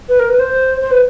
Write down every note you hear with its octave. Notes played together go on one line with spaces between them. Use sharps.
B4
A#4
B4
C5
C5
B4